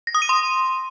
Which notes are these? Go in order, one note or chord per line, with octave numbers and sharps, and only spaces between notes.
A#6
D#6
D#7
C6